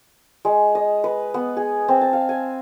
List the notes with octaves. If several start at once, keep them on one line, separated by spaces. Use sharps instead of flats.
G#3
D#5
B4
B3
G#4
C4
A5
F5
G#5